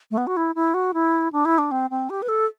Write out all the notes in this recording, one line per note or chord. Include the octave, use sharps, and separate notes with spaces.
A3
B3
F#4
E4
E4
F#4
E4
D4
E4
D4
C4
C4
G4
B4
A4